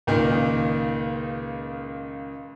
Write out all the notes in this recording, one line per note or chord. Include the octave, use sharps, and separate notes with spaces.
C#2 A#2 D#3